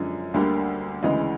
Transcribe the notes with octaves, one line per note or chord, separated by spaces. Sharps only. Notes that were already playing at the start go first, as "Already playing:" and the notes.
Already playing: F#2 D3 F3 G#3 D5
D2 D3 G3 A#3
D2 C#3 E3 G#3 D#5